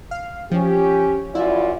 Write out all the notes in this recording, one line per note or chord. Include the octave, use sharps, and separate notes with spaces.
F5
F3 C#4 G4
F#2 E4 F4 D5